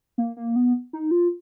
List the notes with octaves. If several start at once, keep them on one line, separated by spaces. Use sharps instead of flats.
A#3
A#3
B3
D#4
F4